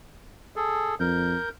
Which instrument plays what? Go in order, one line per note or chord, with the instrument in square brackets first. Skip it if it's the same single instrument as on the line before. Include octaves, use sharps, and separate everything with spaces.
[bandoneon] G#4 A4
[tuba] F2 [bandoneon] A#4 G6